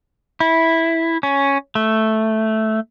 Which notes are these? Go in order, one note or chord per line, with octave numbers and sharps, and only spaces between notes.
E4
C#4
A3